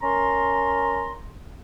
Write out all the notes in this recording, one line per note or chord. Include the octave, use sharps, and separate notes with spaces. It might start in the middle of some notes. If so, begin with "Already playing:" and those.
C#4 A#4 A#5 C6